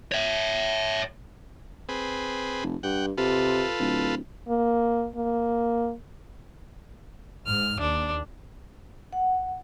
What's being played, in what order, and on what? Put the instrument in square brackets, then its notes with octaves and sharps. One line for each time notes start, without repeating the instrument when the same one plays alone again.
[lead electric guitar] C#5 E5
[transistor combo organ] C4 G#4 B4
[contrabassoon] F1
[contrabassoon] G2 [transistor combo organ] F#5 G5
[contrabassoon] C3 [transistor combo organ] F4 A4 B4
[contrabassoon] D1
[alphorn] A#3
A#3
[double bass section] G#2 [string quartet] F6
[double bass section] D#2 [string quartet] D4
[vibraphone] F#5